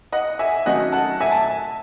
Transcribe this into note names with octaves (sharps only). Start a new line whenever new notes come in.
D#5 F#5
E5 G#5
D#3 F#3 A3 C#4 D#5 F#5
F#5 A5
E5 G#5
A5